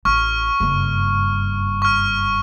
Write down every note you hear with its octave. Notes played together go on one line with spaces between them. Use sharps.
A1 C#6 F6
F#1 G2
C#6 F6